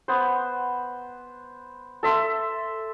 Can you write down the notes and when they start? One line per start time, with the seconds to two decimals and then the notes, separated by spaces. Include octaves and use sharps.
0.08 B3 C5
2.03 A4 E5 C6